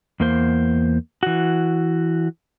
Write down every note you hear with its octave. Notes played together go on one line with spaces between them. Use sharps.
E2 A#3 C5
E3 F#4